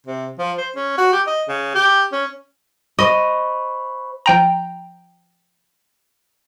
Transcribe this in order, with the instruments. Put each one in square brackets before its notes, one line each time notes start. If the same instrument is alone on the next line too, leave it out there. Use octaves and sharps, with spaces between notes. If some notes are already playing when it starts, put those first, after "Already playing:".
[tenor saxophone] C3
F3
C5
C#4
F#4
G4
D#5
C#3
G4
C#4
[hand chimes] C5 B5 C#6 [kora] D#5
[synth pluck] F3 G5 A#5